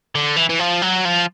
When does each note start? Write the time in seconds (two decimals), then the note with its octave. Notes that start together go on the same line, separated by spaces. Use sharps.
0.15 D3
0.36 E3
0.49 E3
0.59 F3
0.82 F#3
1.05 F3